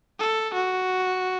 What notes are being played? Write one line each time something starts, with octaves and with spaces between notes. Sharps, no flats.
A4
F#4